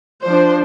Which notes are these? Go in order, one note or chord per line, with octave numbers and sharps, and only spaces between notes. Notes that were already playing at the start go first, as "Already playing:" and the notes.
F3 D4 C5